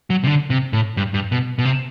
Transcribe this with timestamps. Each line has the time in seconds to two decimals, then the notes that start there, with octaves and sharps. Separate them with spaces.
0.10 F#3
0.24 C3
0.27 D3
0.50 C3
0.73 A2
0.97 G2
1.14 G2
1.32 B2
1.58 B2
1.65 C3